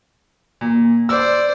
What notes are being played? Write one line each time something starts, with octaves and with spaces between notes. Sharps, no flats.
A#2
C5 D5 E6